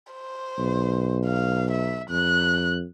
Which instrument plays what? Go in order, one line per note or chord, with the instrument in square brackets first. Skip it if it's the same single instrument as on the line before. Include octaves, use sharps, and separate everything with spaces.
[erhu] C5
[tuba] B1
[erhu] F5
E5
[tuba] F2 [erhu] F#6